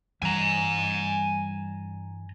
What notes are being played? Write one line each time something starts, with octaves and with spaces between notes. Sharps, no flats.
G2 E3 G3 G#5 A#5